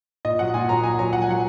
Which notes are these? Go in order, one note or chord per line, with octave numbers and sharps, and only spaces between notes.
A#2 D#5
F#3 F#5
A#2 G#5
F#3 A#5
A#2 G#5
F#3 A#5
A#2 F#5
G#5
F#3 F#5